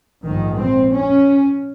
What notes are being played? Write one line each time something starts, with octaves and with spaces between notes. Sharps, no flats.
A#1 G#2 D#3
C4
C#4